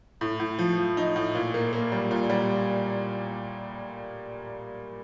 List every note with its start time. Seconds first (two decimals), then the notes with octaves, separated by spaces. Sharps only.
0.21 A2
0.40 A2
0.59 F3
0.78 F3
0.97 D#4
1.16 A2
1.35 A#2
1.54 A#3
1.73 A#3
1.92 G3
2.11 A#2
2.30 G3